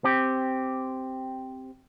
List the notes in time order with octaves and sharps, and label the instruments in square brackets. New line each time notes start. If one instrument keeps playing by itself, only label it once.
[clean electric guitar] C4 G4